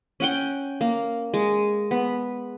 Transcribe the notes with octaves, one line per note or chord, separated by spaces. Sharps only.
C#4 F#5 G5
A#3
G#3
B3